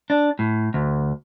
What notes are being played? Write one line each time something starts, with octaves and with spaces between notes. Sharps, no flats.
D4
A2
D2